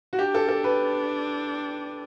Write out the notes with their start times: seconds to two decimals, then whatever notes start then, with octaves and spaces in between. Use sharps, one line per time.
0.13 F#4
0.19 D4 G4
0.34 A4
0.48 A4
0.64 B4